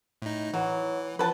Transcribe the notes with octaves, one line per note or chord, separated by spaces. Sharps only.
A2 D#4
E3 F#3
F3 B4 A5